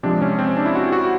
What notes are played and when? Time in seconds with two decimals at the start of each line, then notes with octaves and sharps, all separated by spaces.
0.03 C3 F3 G#3 D4
0.22 C#4
0.39 C4
0.57 D4
0.66 E4
0.75 F#4
0.93 F#4